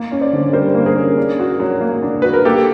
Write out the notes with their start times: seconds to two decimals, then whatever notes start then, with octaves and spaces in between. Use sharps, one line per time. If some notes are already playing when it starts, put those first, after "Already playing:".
Already playing: A#3
0.11 C#4
0.21 C5 D5
0.33 D3
0.53 G3 A#4 C5
0.75 A#3
0.86 G#4 A#4
0.96 C#4
1.17 D4
1.39 F#4
1.60 F#3
1.81 A#3
2.03 D4
2.22 F#4 B4
2.34 A#4
2.45 A#3 G4 A4